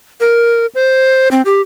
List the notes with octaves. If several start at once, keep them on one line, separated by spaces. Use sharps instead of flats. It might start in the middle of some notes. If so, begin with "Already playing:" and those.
A#4
C5
C4
G4